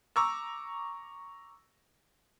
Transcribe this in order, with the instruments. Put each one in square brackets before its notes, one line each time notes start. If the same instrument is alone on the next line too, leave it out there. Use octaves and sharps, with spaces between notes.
[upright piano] A#5 C#6 D6 E6